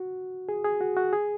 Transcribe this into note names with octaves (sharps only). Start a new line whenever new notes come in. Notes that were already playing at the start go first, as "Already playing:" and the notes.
Already playing: F#4
G#4
G#4
F#4
F#4
G#4